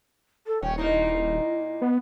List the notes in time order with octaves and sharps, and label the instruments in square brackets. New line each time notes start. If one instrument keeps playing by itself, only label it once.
[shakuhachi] A4
[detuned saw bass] D#1 [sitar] C#4 [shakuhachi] G5
[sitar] A#2 A#3 D#4 [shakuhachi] E4
[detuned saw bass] B3